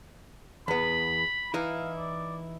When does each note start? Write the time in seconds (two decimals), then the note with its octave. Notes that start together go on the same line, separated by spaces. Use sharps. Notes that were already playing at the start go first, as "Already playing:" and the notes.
0.68 E2 B3 B5
1.54 E3 D#4 E4 F5
1.98 D5